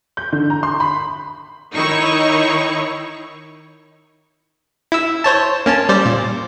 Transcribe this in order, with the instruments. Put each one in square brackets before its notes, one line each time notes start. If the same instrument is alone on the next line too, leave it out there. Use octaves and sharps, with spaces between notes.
[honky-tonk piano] G6
D3
A#5
C6
B5
[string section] D#3 D#4 E4 C#5 C#6
[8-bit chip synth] E4 E6
C5 C#5 A5
A#3 C#4 A5
G3 C5 D5
A#2